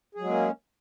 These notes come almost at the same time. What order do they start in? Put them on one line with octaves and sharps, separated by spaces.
G#4 F#3 G#3 A#3 C#4